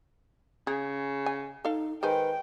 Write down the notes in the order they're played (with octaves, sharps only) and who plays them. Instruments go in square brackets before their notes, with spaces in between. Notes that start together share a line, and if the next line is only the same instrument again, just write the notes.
[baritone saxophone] C#3 [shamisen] G#4
[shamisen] G#5
[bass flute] D#4 [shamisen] A4 F5
[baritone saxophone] D#3 [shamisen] G#3 C5 G#5 [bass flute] B4 [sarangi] G5